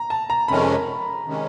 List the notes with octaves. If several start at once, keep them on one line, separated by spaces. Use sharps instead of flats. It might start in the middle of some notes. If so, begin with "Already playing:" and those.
Already playing: A#5
A5
A#5
F2 C3 D#3 G#3 C#4 B5
C3 D#3 G#3 C#4